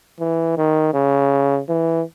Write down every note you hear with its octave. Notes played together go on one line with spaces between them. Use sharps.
E3
D#3
C#3
E3